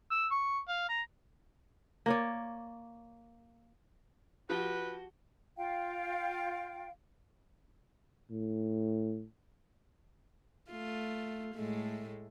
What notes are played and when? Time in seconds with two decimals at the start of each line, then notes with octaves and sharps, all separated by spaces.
0.11 E6
0.31 C#6
0.68 F5
0.89 A#5
2.06 A#3 C#5 D5
4.50 F3 F#4 G4 B4 A5 G7
5.57 F4 F5 G5
8.31 A2
10.70 A3 F4
11.55 A2 G#3 A3